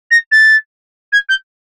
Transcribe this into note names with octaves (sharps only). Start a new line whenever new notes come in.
A#6
A6
G#6
G6